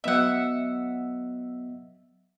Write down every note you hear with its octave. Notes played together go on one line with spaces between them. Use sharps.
F#3 B3 D#5 E5 F#5